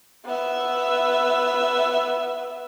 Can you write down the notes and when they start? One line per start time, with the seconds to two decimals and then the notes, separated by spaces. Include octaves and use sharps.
0.25 B3 E5